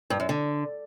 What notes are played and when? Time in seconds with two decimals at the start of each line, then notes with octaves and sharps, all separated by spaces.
0.10 G2
0.20 F#2
0.29 D3